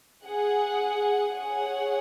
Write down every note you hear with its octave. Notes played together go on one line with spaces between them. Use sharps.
G#4 F#5
G#4 C#5 F#5